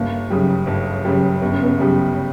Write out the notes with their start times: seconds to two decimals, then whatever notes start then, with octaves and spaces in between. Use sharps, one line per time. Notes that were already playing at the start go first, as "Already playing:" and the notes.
Already playing: G1 A#3
0.30 F#2 C#3 G3
0.67 G1
1.05 F#2 C#3 G3
1.42 G1 B3
1.52 C#4
1.63 B3
1.78 F#2 C#3 G3